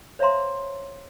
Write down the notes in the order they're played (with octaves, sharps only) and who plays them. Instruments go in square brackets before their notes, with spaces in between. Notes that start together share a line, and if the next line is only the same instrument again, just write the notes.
[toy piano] C5 C#5 E5 F5 A#5 C6